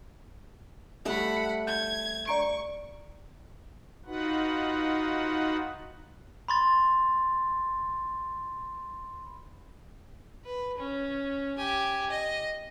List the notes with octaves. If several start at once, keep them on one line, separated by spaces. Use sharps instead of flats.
G3 A3 F#5 A5 B5
C#7
G6 G#6
D5 A#5 C#6 D7
D#4 F4 F#4 B4 F#5
B5 C6 A6
B4
C#4
G4 G#5
D#5